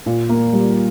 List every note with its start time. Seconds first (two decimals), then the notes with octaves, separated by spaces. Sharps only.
0.06 A#2
0.29 A#3
0.53 G3